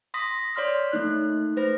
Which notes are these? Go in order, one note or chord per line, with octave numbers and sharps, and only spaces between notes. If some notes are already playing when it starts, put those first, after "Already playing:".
C6 D#6 A#6 B6
C#5 D5 C6 F6 B6
A3 A#3 D#4 F#6
A3 B4 C5 A#6